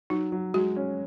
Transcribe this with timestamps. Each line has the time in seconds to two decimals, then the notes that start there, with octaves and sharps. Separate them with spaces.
0.10 F#3 D#4
0.32 F#3
0.54 G#3 F#4
0.76 C#4